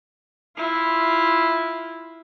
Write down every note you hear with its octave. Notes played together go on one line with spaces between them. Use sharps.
E4 F4